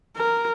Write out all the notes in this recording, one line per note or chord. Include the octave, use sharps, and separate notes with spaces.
A#4